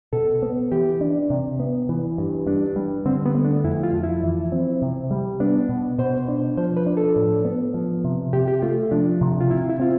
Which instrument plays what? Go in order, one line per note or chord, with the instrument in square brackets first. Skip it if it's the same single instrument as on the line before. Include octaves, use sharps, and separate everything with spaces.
[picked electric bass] B2 [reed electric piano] A4
[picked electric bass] B3
[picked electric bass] E3 [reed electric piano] G4
[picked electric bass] D4
C3
B3
E3
G2
[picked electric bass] G2 [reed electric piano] D4
[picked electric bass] G3
[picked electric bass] D3 [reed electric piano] C4
[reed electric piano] B3
[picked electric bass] A3
[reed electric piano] D4
[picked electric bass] F2 [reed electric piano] E4
[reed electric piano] F4
[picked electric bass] F3
[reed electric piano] E4
[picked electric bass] E3
C4
C3
G3
[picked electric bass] B3 [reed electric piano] D4
[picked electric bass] B2
[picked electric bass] B2 [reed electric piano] C5
[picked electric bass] D4
[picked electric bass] F3 [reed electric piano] C5
[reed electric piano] B4
[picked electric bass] D4
[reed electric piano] A4
[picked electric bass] A2
B3
F3
C3
[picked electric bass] C3 [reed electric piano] G4
[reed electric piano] G4
[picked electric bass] A3 [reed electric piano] F4
[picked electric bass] F3 [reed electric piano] D4
[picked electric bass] C3
[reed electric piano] F4
[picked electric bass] C3 [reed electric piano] E4
[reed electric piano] E4
[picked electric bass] C4 [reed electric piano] F4